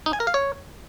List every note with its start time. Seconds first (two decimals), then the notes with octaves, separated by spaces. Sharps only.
0.06 D#4
0.13 G#5
0.20 A#4
0.27 F5
0.34 C#5